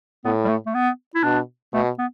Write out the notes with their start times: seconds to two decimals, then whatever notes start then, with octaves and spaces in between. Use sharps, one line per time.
0.25 A2 B3
0.45 G3
0.49 A3
0.66 A3
0.74 B3
1.15 E4
1.24 B2 D4
1.73 B2 A3
1.98 B3